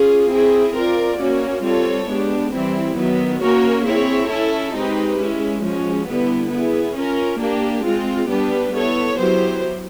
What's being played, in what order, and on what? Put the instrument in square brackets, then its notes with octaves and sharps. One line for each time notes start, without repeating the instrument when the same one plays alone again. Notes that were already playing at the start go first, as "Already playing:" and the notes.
Already playing: [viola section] C#4 F4 G#4
C4 E4 G#4
C4 F4 A#4 D5
A#3 C#4 F#4
G3 C4 F4 A4 C#5
G#3 B3 D4 G4
E3 G3 C4 E4
D#3 F#3 B3
A#3 C#4 F#4 A#4 C#5
C4 E4 G#4 C#5
C#4 E4 A4
G#3 C4 D#4 G4 B4
G#3 C#4 E4
F3 G#3 C#4 F#4
D3 G3 B3 E4
B3 E4 G#4
C#4 F4 A#4
A#3 D4 G4
G#3 C4 F4
G3 B3 D4 G4 B4
B3 E4 A4 C#5
F#3 B3 E4 G4 C5